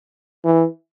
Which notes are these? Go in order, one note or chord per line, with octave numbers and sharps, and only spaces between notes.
E3